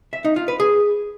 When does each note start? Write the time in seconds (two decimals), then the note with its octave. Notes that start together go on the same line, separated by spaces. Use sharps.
0.13 E5
0.25 D#4
0.36 F4
0.48 B4
0.60 G#4